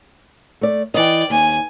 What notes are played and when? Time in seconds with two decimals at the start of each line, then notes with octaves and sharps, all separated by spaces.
0.61 A3 D5
0.94 E3 D5 D#5 G5
1.30 D#2 G#5